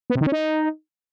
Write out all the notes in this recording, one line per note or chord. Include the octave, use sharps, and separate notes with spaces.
B3
C3
D#3
C#4
D#4